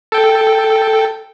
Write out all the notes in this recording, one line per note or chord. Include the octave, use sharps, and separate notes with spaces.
A4 G5